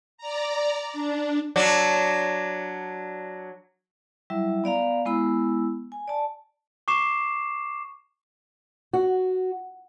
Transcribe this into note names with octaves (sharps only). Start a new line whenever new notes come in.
D5 A#5
D4
F#3 D4
F#3 G3 E4 E5
B3 D5 F5 A#5
G#3 B3 E4 B5 E6
G#5
D5 A5
C#6 D6 C7 E7
F#4